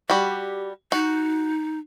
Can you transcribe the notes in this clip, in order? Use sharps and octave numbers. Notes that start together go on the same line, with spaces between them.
G3 F#4 G4
D#4 F#4